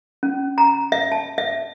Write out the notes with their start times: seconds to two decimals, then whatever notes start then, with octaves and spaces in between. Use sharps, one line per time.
0.23 C#4
0.58 A#5
0.92 E5
1.12 A5
1.38 E5